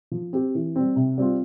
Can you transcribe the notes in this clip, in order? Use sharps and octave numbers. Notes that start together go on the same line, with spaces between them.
F3
C4 G4
E3
G3 C4
C3
G3 C4 F4